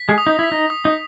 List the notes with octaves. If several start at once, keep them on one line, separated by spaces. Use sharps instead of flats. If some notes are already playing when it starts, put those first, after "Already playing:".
Already playing: B6
G#3 G#4
D#6
D#4
E4 B6
D#4
D#6
D#4